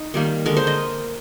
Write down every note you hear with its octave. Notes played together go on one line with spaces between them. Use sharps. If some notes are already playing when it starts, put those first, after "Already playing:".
Already playing: D#4
D#3 G3 A#3
D3 G#3 A#4
C5
D#5